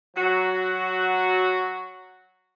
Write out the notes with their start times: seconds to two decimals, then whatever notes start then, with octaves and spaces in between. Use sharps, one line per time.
0.16 F#3 F#4